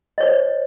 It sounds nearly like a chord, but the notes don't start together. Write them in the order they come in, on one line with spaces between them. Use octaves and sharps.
D#5 C#5 C5